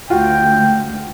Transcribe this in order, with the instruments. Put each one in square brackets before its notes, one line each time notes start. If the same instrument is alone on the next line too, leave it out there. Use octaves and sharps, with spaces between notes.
[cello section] D2 [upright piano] F4 F#4 [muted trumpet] G5